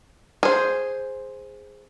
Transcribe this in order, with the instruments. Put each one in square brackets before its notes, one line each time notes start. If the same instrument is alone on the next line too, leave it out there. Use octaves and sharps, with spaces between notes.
[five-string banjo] G#4 C5